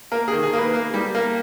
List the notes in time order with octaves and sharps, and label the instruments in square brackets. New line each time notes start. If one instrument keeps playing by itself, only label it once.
[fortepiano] A#3 [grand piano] A#4
[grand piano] G#4
[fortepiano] D#3
[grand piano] G#4
[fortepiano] A#3 [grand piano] B4
[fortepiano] A#3
G3
A#3